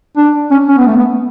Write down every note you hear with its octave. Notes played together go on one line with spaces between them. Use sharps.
D4
C#4
C#4
B3
A3
B3